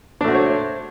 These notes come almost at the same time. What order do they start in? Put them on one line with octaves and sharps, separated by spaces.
D4 A3 F#4 C5 C#5